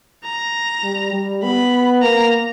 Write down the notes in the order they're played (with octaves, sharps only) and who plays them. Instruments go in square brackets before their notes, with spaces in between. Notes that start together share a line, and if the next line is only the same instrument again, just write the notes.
[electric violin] A#5
[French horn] G3
G3
[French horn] B3 [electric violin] B5
[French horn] A#3 [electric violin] A#5